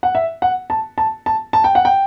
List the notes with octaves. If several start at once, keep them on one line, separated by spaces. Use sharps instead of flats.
F#5
E5
F#5
A5
A5
A5
A5
G5
F#5
G5